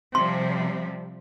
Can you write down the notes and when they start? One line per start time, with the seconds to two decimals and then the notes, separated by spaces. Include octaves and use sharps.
0.15 C3 F3 G3 C6